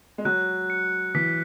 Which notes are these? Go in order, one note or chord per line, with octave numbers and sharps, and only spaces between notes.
G#3
F#3 F#6
C#7
E3 B6